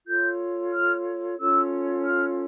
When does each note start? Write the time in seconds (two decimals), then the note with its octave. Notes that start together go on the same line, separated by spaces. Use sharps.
0.07 F4 A4 C#5 G6
0.72 F6
1.38 C#4 F4 A4 C#5 E6
2.03 F6